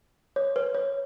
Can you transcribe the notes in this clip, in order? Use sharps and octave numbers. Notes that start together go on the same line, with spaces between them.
C#5
B4
C#5